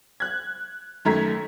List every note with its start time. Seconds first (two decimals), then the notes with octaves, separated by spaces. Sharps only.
0.20 F#6 G#6
1.05 F#2 D#3 A3 A#5 G#6 B6